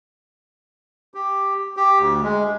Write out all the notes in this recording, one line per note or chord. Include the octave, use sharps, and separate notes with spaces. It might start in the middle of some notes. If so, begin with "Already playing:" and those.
G4
G4
D2
G#3